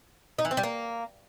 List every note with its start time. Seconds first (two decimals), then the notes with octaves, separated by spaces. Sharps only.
0.39 D#4
0.45 E3
0.51 C4
0.57 G3
0.63 A#3